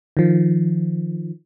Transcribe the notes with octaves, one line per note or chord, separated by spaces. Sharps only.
D#3 F3